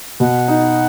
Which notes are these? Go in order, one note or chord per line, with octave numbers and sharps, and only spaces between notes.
B2 F#5
D#4